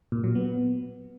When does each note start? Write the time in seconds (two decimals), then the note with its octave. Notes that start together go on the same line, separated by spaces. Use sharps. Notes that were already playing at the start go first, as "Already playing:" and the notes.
0.12 A#2
0.24 F#3
0.35 B3